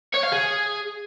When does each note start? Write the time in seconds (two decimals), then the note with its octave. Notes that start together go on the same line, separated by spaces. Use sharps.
0.14 C#5
0.23 F5
0.32 G#4